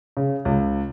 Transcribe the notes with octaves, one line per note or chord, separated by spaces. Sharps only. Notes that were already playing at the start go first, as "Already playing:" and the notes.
C#3
C#2